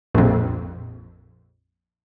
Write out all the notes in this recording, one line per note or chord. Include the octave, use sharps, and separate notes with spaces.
A#1 F2